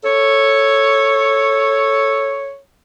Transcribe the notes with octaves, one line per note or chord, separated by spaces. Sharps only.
A4 C#5